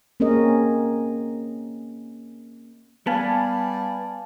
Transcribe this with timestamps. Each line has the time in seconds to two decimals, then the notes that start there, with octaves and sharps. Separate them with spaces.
0.20 A#3 C4 C#4 G#4 A#4 D#5
3.07 G3 B3 F5 G#5 A5